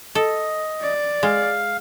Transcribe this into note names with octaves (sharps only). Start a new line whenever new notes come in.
A4 D#5
D5
G#3 F5